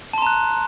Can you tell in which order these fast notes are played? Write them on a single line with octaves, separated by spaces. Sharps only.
A5 C6 A#5 F#6